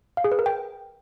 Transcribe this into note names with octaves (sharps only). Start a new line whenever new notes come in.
F5
G#4
B4
A#4
G5